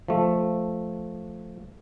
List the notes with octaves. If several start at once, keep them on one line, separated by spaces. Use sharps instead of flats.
F3 A3